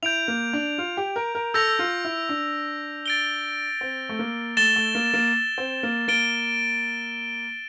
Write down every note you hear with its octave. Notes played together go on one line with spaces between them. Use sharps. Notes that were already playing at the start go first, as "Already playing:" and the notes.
E4 G6 D7 F7
A#3
D4
F4
G4
A#4
A#4
A4 E6 G6 A#6 F7
F4
E4
D4
A6 D7 G7
C4
A3
A#3
A3 A6 E7 G7
A3
A#3
A#3
C4
A#3
A#3 A6 D7 G7